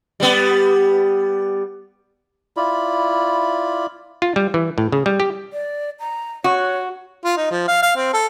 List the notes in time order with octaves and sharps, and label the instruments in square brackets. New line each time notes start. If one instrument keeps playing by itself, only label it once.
[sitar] G3 B3
[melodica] E4 F4 D5 B5
[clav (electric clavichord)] F4
G3
E3
A2
C#3
G3
G4
[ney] D5
A#5
[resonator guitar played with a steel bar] F#4 [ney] C#5
[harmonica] F4
D#4
F3
F5
F5
C4
A4